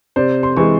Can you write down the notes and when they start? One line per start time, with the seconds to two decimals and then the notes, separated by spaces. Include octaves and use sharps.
0.16 C3 C5 D5
0.43 C6
0.56 E3 G#3 C#6